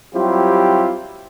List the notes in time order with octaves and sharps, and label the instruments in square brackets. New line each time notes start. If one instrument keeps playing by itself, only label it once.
[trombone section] F#3 G3 C4 E4 F4 G4